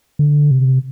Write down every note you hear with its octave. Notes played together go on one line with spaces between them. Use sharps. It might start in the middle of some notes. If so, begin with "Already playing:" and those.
D3
C3